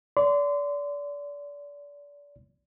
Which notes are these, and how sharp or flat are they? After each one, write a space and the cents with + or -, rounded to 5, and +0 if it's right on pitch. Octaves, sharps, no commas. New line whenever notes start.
D5 -30 C6 -30